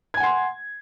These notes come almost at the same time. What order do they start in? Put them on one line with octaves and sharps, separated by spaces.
G#6 G#5 F#5 C6